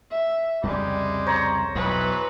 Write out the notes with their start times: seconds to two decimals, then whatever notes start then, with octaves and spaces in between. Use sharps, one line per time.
0.11 E5
0.63 C2 F2 C#3 G3 G#3 G4
1.26 C5 C#5 A#5
1.75 B1 E2 E3 F#3 B3 B4